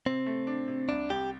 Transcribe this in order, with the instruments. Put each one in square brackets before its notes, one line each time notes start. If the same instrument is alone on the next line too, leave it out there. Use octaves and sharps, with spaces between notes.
[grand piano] C3 [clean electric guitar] C4
[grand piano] A3
D4
C3
[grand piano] C2 [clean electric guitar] D4
[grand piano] C2 [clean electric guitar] G4